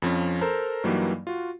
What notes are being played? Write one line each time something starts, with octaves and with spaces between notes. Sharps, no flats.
F2 F3 C#4
A4 A#4 C5 A#5
G2 E3 F#3 G3 A#3 D#4
F4 F#4